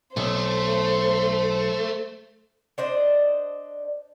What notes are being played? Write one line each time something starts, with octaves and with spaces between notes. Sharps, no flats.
B1 A3 C5
D4 C5 D#5